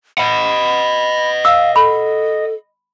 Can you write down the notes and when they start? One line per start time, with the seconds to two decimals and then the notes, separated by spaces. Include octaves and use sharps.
0.18 D#5 F#5 B5
1.45 F5 E6
1.76 A4 B5